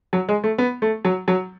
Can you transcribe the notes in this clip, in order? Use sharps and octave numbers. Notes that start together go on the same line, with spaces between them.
F#3
G#3
A3
B3
A3
F#3
F#3